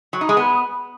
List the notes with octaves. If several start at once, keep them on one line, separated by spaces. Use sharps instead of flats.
F#3
D#4
G#3
B3